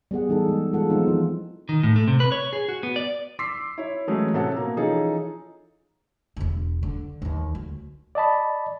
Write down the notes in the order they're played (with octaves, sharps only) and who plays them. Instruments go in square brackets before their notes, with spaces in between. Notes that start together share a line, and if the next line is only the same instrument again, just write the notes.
[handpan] G3 B3 G#4 F#5
E3 D#4 G#4 A4
G#3
E3 G#3 F4 A4 F#5
F3 G#3 B3 C4 D#4 F4
E3
[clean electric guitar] D#3
A2
A3
C3
B4
C#5
G#4
F#4
B3
D5
[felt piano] C6 D6 E6 B6 C7
E4 C#5
E3 F#3 G#3 A3 C#4
C3 C#4 A4 F#5 A5
B2 A#3 A#5
E3 F3 C#4 D#4 G#4 A4
[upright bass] E1 D3
D3
D#2 E3
D2
[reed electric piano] D5 D#5 A5 B5